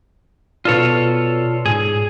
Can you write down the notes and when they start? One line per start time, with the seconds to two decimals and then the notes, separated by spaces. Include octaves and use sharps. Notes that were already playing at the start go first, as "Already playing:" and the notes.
0.65 B2 F4 A4 B4 C#5 D5
1.66 G#2 G#4